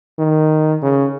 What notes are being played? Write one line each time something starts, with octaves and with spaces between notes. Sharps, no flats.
D#3
C#3